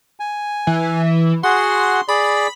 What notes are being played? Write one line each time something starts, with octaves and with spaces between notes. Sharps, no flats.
G#5
E3
F#4 G#4 F#5 C6
G#4 D5 B5